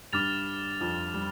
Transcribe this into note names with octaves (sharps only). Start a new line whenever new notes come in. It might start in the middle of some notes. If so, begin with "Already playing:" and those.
G2 G3 D6 F6 A6 F7
F2 F3
G3